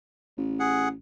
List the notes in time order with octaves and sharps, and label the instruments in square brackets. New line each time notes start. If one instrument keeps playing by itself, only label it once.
[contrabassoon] A1
[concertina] G#4 F#5